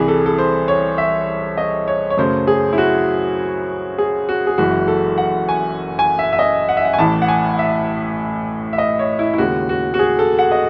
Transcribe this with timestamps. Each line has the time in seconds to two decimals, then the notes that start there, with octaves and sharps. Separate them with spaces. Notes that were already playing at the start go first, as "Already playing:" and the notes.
Already playing: C2 C3 E3 G#4
0.08 A4
0.26 A4
0.38 C5
0.68 C#5
0.98 E5
1.58 D#5
1.88 C#5
2.10 C#5
2.17 F#2 C#3 F#3 A3 C5
2.47 G#4
2.73 E4
2.78 F#4
3.98 G#4
4.29 F#4
4.47 G#4
4.58 F#1 F#2 E3 G#3 F#4
4.88 A4
5.18 F#5
5.49 G#5
5.99 G#5
6.19 E5
6.33 E5
6.39 D#5
6.69 F#5
6.77 E5
6.85 F#5
6.93 G#5
6.98 A1 A2 E3 A5
7.22 F#5
7.28 G#5
7.54 F#5
7.59 E5
8.73 E5
8.78 D#5
8.99 C#5
9.19 E4
9.34 E4
9.38 D#2 C#3 G#3 F#4
9.69 F#4
9.94 F#4
9.99 G#4
10.19 A4
10.39 F#5
10.52 D#5